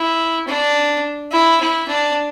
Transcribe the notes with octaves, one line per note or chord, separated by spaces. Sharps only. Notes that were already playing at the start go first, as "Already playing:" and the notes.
Already playing: E4
D4
E4
E4
D4